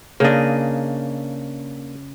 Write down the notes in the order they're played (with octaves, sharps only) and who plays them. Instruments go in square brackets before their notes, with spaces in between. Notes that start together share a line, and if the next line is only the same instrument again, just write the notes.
[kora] C#3 D#5 [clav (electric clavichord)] A#3 D4